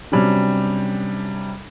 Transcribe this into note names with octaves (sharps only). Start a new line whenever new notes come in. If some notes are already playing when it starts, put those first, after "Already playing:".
C3 F#3 G3 C#4 D4